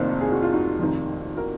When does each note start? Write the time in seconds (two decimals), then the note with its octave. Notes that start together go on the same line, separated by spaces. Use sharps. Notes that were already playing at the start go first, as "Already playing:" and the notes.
Already playing: F1 F2 D#3 A#3 C4
0.21 G#4
0.31 F#4
0.42 F4
0.53 D#4 F#4
0.79 F1 F2 D#3
1.37 F#4 A#4